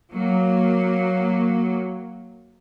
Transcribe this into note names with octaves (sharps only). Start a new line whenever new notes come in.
F#3 A#3